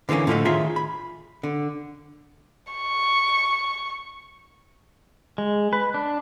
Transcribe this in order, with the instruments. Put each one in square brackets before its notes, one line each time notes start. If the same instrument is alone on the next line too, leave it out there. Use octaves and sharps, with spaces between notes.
[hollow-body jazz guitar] D3 E3 A#3 B3 C#4
A2 D3 F3 G3 A3 D#4
D#3 F4 G#4 C#5 E5 C6
B5
D3
[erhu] C#6
[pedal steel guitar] G#3
B4
D4